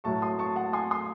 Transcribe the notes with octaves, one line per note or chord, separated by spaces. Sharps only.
A2 F#3 A3 A5 C#6
C6 D#6
A5 C#6
F#5 A5
G#5 C6
C6 D#6